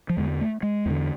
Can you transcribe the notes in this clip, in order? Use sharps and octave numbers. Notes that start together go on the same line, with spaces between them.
F3
E2 D3 G#3
A3
G#3
E2 D3